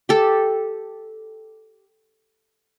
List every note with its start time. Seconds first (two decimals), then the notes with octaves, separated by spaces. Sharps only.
0.09 G4 A4